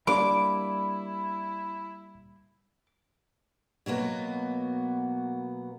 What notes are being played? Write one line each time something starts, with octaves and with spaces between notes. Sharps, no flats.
G3 A#3 D4 E4 B5 D6
B2 F#3 A#3 B3